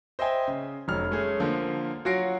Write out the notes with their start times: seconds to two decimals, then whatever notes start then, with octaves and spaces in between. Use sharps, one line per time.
0.19 C5 D#5 E5 G5 G#5
0.48 C#3
0.88 F1 F#3 F6
1.11 G#3 A3 C#4 G#4
1.40 D3 F3 A#3
2.05 F#3 F4 F#4 A#6 C7 D7